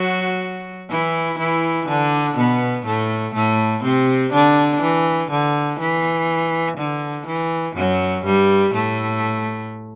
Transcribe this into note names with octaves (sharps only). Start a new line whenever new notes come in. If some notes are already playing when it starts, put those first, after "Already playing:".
Already playing: F#3 F#4
E3 E4
E3 E4
D3 D4
B2 B3
A2 A3
A2 A3
C3 C4
D3 D4
E3
D3
E3
D3
E3
F#2 F#3
G2 G3
A2 A3